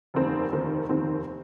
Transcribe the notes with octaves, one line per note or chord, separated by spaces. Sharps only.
F1 D#2 D#3 C4
F1 D#2 D#3 C4
F1 D#2 D#3 C4